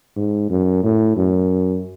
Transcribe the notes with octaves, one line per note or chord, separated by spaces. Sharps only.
G#2
F#2
A2
F#2